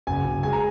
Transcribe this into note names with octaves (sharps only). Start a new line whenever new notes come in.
F#1 G#5
F#1
G#3 G#5
A#5